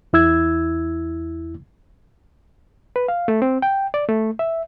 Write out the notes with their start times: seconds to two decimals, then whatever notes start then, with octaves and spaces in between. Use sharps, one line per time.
0.13 E2 E4 E6 G#6
2.96 B4
3.08 F5
3.28 A3
3.42 C4
3.62 G5
3.94 D5
4.09 A3
4.39 E5